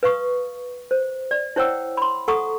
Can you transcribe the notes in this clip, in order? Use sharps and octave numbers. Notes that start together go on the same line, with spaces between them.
B4 F5 C#6 D#6
C5
D5
E4 C5 C#5 F#5 G5 E6
B5 C6
A4 F#5 A#5 C#6 D#6